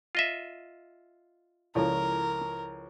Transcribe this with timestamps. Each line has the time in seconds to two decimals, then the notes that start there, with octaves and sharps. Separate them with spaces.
0.15 F4 D#5 E5
1.75 C#2 F3 E4 A4 A#4 C#5 D5